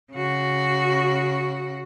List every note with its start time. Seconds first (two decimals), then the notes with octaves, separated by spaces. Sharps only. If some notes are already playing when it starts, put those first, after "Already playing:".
0.12 C#3 F#4